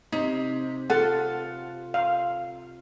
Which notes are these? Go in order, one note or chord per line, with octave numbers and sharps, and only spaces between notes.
C3 D#4
F4 A4 F#5
F5